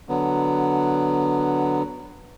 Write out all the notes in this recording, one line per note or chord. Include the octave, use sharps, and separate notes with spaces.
D3 F#3 B3